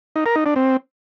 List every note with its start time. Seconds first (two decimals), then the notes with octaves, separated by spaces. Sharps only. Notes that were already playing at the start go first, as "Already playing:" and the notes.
0.16 D#4
0.26 A#4
0.36 D#4
0.46 D4
0.56 C4